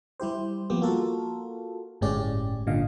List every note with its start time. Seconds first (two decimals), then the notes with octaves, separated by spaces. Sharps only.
0.20 G3 E4 G4 C5
0.70 F3 G3 A#3 B3 G4
0.81 A#3 F4 F#4 A4 A#4
2.01 G1 A2 G#3 C#4 G4 D5
2.67 G#1 A#2 D3 D#5 F5